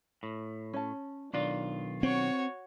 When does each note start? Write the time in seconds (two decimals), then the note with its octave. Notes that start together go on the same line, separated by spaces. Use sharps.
0.23 A2
0.73 C#4 A5
1.33 B1 D#3 D4 F4
2.03 C4 F#4 C#5